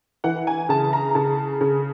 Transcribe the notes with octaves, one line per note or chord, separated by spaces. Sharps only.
E3 F#5
G#5
C#3 A5
A#5
C#3 A5
C#3